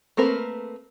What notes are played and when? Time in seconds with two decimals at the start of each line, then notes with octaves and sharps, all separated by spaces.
0.17 A3 A#3 C4 A#4 B4